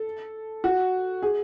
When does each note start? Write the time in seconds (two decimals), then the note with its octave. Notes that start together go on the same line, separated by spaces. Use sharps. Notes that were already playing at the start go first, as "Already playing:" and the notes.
Already playing: A4
0.64 F#4
1.22 G#4